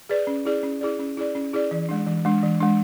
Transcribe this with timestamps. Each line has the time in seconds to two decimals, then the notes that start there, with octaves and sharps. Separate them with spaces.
0.09 G#4 B4 D5
0.27 C#4
0.45 E4 G#4 D5
0.63 C#4
0.81 E4 G#4 D5
0.99 C#4
1.17 E4 G#4 D5
1.35 C#4
1.53 E4 G#4 D5
1.71 E3
1.89 G#3 D4
2.07 E3
2.25 G#3 D4
2.43 E3
2.60 G#3 D4